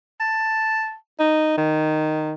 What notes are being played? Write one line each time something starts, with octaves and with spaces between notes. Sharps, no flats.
A5
D#4
D#3